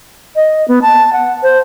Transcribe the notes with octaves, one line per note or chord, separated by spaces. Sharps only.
D#5
B3
A5
F#5
C5